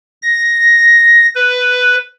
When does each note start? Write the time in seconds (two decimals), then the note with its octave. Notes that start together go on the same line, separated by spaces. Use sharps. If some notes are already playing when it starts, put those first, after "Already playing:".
0.22 A#6
1.35 B4